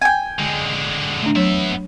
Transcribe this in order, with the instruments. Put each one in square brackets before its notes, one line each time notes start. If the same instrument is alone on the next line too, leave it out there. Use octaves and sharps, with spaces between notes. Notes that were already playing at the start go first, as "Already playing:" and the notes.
[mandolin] G5 G#5
[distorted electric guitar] D3 G#3
[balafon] A3 D4
[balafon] F#3 C#5 [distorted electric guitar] B3 E5